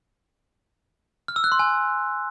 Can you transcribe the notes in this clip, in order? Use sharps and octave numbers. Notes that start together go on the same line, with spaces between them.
F6
E6
F#6
C6
G#5